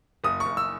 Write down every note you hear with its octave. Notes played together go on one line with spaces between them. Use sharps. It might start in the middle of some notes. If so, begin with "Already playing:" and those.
F#1 D#6
C#6
F#1
E6